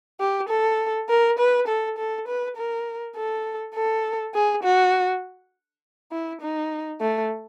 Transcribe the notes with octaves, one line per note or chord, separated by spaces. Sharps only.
G4
A4
A#4
B4
A4
A4
B4
A#4
A4
A4
G#4
F#4
E4
D#4
A3